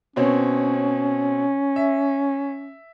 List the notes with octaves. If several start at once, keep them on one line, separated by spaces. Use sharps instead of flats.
B2 C4 C#4 C#5
E5